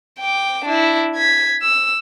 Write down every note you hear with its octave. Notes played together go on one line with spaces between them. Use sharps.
G5 D6
D4 E4
G#6 B6
E6